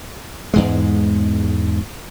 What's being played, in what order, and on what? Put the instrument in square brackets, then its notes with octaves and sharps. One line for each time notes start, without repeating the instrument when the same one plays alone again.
[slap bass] E2 G#2 G#3